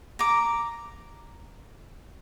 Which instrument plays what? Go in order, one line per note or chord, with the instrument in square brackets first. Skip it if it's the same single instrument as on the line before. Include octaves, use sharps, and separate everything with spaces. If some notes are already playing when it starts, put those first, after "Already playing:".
[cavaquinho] A#5 D6